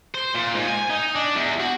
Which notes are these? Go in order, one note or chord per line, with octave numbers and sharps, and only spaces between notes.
C5
A#2
G#2
G#5
D#4
D4
E2
F#4